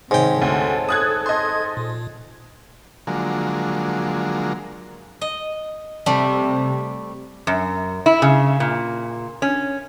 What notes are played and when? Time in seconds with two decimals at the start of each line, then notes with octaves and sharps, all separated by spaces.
0.11 G#2 C3 D#3 C#5 G5
0.42 D2 A4
0.89 D#6 F#6 G#6
1.26 D#5 C6 G#6
1.77 A#2
3.07 D3 F3 F#3 G#3 A#3
5.21 D#5
6.06 C3 G3 A3 B5
7.47 F#2
8.06 E4
8.22 C#3
8.60 A#2
9.42 C#4